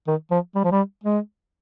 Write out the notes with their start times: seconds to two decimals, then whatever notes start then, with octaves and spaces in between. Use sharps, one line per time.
0.07 D#3
0.31 F3
0.55 G3
0.64 F3
0.72 G3
1.04 G#3